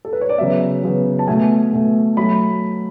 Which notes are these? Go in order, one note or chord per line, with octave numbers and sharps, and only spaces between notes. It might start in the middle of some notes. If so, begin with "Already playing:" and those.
A4
B4
C#5
D5
C#3 F#3 B3 E5
C#3 F#3 B3
A5
B2 A3 G#5
B2 A3
F#3 A3 B5